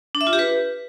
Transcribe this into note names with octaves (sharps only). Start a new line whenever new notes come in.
D4
E5
F4
G4
B4